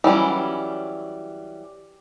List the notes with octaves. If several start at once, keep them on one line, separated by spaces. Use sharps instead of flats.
E3 F#3 G3 C#4